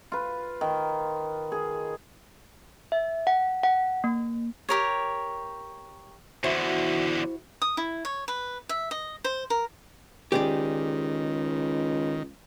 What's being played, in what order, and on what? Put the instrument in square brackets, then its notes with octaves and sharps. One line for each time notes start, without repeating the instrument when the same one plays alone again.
[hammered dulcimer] F4 B4
D#3
G#4
[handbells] E5
F#5
F#5
A#3
[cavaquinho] G4 A#4 C#5
[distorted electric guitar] E2 D3 [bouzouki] E4 F#4 C5
[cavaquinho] D#6
E4
C#5
B4
E5
D#5
C5
A#4
[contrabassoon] C#2 [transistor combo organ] D#3 [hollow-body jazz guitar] G4 G#4 D5